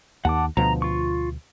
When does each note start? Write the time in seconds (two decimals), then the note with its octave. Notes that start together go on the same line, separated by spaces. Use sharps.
0.25 D#2 F#5 A5 D6
0.57 D2 B2 F3 A#5
0.82 F4 C#6